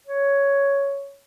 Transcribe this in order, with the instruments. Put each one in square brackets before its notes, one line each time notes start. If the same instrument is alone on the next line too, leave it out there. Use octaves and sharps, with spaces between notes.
[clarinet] C#5